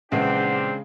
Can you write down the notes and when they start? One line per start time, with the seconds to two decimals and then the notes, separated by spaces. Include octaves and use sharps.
0.12 A#1 C#3 E3 G#3 C4 D4 G4 F#5